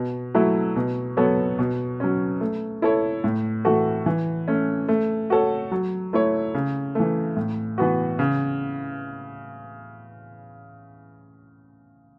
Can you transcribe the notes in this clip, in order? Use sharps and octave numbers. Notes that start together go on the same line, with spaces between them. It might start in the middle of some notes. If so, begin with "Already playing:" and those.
Already playing: B2
F#3 A3 E4
B2
F#3 B3 A4 C#5
B2
F#3 C#4
A3
E4 A4 C#5
A2
E3 A3 F#4 A4
E3
A3 C#4
A3
F#4 A4 C#5
F#3
A3 E4 C#5
C#3
E3 A3
A2
E3 B3 F#4
C#3